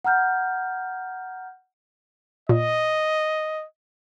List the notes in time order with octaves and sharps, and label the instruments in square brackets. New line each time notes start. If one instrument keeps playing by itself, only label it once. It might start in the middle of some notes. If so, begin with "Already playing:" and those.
[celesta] F#5 A#5 F6 G6
[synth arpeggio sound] A#2 [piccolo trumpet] D#5